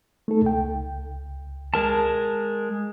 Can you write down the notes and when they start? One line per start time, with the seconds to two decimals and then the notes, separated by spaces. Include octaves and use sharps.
0.28 A3 D#4 A4
0.42 C#2 G5
1.74 G#3 A#4 A5